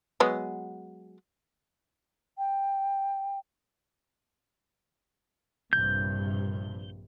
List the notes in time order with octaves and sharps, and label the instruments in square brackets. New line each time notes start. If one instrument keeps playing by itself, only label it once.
[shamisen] F#3 G#3 B3
[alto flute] G5
[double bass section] A#1 G2 C3 [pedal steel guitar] G6